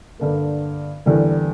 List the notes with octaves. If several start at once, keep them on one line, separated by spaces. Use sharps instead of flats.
G2 D3 A#3
E2 D3 G3 A#3